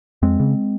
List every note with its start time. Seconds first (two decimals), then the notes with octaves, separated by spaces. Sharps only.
0.22 F2 G#3 C4
0.40 C#3